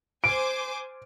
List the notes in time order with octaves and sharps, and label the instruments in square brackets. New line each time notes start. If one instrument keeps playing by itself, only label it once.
[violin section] C5 G#5 D6 [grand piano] D7